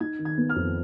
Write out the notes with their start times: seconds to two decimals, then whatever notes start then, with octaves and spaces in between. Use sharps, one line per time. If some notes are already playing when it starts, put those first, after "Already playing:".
0.01 D#4 G#6
0.19 D#3
0.25 G#6
0.38 B3
0.49 F6
0.56 F2